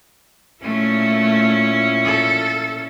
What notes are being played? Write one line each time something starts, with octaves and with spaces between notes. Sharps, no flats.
A#2 A3 C#4 E4
A4